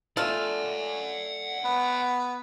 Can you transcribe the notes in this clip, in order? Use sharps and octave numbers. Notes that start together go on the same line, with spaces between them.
A3 D4 F4 A4 F#5 G#5
B3